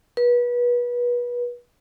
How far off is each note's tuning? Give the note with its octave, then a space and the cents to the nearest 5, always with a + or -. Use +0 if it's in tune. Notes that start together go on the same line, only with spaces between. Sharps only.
B4 -30